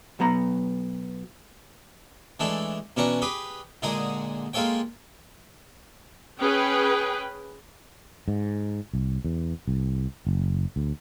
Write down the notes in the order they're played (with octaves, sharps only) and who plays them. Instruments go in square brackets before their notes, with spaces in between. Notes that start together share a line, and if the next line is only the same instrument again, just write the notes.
[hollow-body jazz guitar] B1 F#3 B3 A#5
[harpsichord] E3 G#3 A3 D4 A4
B2 E3 C#4 D4 A#5 C#6
G4 G#4 B4
A#2 D3 G#3 G#4 A#5 D#6
G#3 A#3 F4 A4 C#5 G5
[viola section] C#4 G#4 B4 G5
[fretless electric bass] G#2
C2
E2
C2
F#1
D2